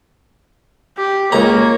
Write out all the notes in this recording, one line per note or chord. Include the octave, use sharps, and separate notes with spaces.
G4
C#2 A#3 C#5 A#5